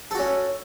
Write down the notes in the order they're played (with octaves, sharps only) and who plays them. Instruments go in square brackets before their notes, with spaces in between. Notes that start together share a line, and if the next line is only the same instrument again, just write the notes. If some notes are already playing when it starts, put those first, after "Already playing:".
[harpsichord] A4
F#4
C#4